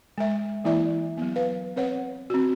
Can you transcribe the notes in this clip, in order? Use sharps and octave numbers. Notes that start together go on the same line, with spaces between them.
G#3 E5
E3 A#3 E4 D5 E5
F#3 B3
B4 F5
C4 B4 C#5 F#5
C4 F#4